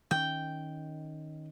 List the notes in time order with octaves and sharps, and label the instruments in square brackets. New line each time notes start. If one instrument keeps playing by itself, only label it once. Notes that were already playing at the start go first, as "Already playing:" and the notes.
[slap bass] D#3 C#4 [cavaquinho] G5